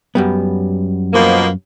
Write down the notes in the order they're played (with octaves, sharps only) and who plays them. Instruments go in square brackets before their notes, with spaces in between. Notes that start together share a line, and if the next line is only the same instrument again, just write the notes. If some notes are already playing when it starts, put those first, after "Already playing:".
[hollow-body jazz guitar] F#2 G3 B3
[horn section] B2 F3 A#3